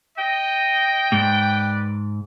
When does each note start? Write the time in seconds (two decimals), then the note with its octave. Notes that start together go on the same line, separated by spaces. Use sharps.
0.18 D#5 G5
1.12 G#2 B4 D5